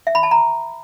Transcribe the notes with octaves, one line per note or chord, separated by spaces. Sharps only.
E5
B5
A5
A#5